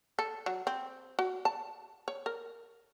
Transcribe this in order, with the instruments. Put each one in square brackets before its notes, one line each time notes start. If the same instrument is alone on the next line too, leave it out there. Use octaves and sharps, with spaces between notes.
[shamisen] A4
F#3
C4
F#4
A5
C#5
A#4